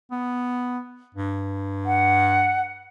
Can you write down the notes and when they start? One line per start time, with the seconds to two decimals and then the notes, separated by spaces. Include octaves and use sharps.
0.11 B3
1.14 G2
1.86 F#5